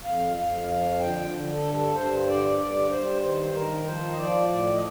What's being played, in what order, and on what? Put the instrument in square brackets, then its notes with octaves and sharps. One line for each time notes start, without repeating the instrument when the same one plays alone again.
[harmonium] F2 F5
F2 F5
F3 F5
D3 G5
D3
A4
G2
A4
G2 C5
D3 D5
G2 D5
G2 C5
D#3 C5
D#3 A#4
F3 C5
D#5
F3 D5
A2 D5
D#5